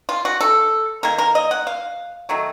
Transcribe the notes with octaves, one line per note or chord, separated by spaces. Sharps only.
F4
F#4
A4
D#3 A#3 A#4
A#4
D#5
F#5
F5
D#3 F#3 A3